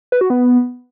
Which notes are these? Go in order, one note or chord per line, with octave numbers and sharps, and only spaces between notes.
B4
F#4
B3